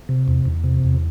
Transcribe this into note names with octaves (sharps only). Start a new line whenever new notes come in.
C3
E2
E2
C3
E2